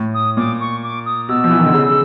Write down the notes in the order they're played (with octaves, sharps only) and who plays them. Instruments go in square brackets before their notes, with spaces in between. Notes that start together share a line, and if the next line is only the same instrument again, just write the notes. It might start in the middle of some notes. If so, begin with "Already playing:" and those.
Already playing: [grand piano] A2
[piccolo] D#6
[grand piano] A#2 [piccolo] D6
[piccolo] C#6
D6
D#6
[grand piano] B2 [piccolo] E6
[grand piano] F3
E3
D#3
D3
C#3